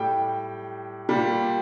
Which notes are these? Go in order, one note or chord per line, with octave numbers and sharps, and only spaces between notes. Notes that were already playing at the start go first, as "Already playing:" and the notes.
Already playing: A2 G3 G5
A#2 G3